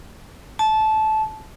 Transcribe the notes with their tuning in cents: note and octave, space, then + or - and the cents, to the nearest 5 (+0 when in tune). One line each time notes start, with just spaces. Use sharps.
A5 -20